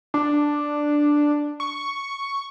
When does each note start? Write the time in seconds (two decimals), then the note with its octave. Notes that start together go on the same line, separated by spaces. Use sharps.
0.14 D4
1.60 C#6